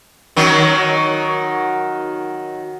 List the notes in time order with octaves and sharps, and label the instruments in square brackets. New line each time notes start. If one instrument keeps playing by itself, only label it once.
[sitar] D#3 F#3